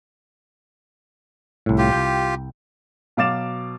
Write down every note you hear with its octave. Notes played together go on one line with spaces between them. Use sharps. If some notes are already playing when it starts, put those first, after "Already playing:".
C2 A2
F4 G4
C2 G5
B2 F#3 F5 D6 A6 E7